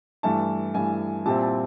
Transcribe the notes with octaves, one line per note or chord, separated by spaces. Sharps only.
G2 E3 A3 A5
G2 E3 A3 G#5
A#2 G3 C4 E4 A5
A5